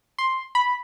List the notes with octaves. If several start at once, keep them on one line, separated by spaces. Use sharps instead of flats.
C6
B5